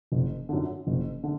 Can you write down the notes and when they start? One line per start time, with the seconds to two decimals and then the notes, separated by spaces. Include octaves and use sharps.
0.12 F#1
0.49 F#2 D3
0.87 F#1
1.24 D3